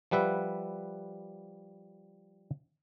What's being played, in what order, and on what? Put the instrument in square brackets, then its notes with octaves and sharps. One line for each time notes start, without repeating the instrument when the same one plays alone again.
[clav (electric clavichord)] F3 G3 B4 E5 F#5